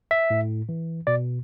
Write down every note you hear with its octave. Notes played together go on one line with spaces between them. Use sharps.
E5
A2
E3
B2 D5